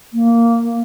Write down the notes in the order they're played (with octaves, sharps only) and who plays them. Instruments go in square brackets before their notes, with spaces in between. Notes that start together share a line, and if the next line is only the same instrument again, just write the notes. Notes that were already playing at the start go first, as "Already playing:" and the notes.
[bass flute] A#3